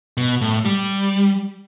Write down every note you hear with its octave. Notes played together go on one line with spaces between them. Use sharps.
B2
A2
G3